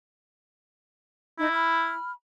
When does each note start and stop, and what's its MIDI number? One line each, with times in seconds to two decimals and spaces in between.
1.39 1.49 63
1.39 1.95 64
1.52 2.12 83
1.52 2.12 89